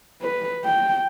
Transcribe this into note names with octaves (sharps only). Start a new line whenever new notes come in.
B4
G5